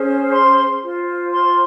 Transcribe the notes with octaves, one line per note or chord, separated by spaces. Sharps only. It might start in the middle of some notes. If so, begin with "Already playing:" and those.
Already playing: C#4 G#4 C5
C6
F4 C5
C6